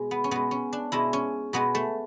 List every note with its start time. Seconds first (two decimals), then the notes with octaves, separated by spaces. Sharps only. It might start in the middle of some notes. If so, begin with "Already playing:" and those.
Already playing: B2 G#3
0.11 B3
0.24 C#4
0.31 B2 G#3 B3
0.51 C#4
0.73 D4
0.92 B2 G#3 E4
1.13 C#4
1.53 B2 G#3 B3
1.75 A3